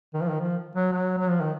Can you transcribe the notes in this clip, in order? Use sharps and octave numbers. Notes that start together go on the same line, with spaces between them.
D#3
F3
D#3
F3
F#3
F#3
F#3
F3
D#3